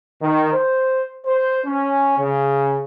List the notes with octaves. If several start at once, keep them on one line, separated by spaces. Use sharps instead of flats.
D#3
C5
C5
C#4
C#3